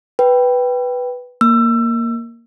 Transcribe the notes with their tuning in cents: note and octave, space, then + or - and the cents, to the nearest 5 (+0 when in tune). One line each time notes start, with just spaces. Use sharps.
B4 +0 G5 -5
A#3 +0 E6 +25